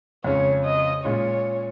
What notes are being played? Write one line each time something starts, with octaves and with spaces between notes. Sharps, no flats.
F2 C#3 G#3 C#4 C#5
D#5
A#2 G#3 C#4 F4 C#5